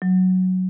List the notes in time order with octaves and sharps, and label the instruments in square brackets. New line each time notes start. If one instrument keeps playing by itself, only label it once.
[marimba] F#3